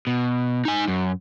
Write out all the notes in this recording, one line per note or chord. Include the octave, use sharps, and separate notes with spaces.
B2
D#4 G#5
F#2